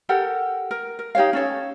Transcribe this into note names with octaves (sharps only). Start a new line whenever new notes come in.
G4 A4 A#4 F#5
A#4
A#4
D#4 G4 C#5 F5
C#4 A4 C#5